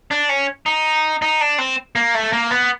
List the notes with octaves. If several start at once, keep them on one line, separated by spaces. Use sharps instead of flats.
D4
C#4
D#4
D#4
D4
C4
A#3
A3
A#3
B3